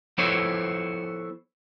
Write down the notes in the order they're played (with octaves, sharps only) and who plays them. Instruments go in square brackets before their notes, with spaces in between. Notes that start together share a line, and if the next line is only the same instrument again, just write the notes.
[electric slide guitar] F3 B3 E4 A4 C5 C#5